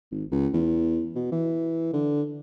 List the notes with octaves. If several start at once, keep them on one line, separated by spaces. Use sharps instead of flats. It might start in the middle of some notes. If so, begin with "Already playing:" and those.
G#1
C#2
E2
B2
E3
D3